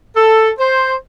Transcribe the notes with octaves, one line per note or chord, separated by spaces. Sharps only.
A4
C5